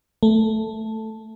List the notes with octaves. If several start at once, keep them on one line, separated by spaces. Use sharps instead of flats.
A3